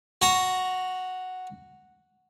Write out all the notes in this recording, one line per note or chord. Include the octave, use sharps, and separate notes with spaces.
F#4 A#5